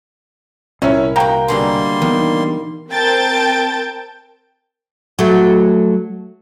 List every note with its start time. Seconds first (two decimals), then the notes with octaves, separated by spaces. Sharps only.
0.82 C2 C4 C#4 E4 A#4 C#5
1.16 A#3 F#4 G5 A#5
1.48 B2 D3 G3 G#3 A#3 C6
2.02 D#3 E3 B3 D4
2.90 C4 A#4 G5 A5 G6 A6
5.19 F#3 A3